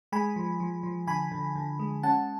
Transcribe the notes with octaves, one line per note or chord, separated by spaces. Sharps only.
G#3 G#5 B5
F3
F3
F3
D3 G#5 B5
D3
D3
G#3
C#4 F#5 A5